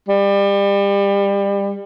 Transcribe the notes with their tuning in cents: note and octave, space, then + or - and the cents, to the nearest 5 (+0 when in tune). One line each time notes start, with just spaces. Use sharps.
G3 +30